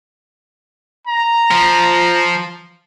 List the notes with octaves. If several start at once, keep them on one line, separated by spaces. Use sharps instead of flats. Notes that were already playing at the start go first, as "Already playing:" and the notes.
A#5
F3